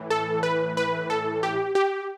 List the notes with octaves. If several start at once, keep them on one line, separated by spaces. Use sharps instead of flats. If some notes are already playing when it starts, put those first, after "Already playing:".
Already playing: A2 E3
A4
B4
B4
A4
G4
G4